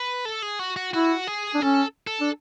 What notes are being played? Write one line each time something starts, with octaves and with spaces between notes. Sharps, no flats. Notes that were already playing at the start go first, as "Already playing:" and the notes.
Already playing: B4
A4
G#4
F#4
F#4
E4 F#4
G#4
D4
C#4 A4
A4
D4